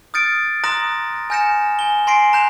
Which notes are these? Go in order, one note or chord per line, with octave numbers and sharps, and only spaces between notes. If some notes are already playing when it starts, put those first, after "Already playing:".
D#6 F6 G6 A6 C#7 D7
A#5 C6 D#6 F#6 A#6
G#5 F6 G6 A#6 C#7 E7
G#5 G7
G#5 C6 A#6 C7 D7
A#5 F#6 G6 F7